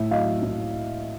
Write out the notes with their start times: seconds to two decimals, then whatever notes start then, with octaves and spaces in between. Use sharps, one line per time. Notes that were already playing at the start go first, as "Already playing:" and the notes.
Already playing: A2 E5
0.11 F#3 D#5 F5
0.42 A2